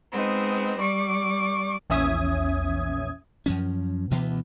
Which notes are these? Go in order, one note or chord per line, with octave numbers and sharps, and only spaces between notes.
G#3 B3 C4 D#4
G3 D5 C#6 D6
A#1 E2 C#4 E5 D#6 G#6
F#2 F3 C#4
D2 B2 E3 B3